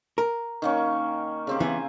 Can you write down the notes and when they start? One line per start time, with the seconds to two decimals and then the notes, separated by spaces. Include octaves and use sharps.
0.18 A#4
0.62 D#3 A#3 C#4
1.47 C#3 C4 G4
1.60 E3 B3 G#5